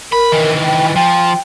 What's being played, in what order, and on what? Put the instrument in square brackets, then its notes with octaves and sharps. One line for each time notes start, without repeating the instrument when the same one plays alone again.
[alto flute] A#4 [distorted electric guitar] B5
[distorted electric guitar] D#3 E3
[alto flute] G5
[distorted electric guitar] F3 [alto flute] G5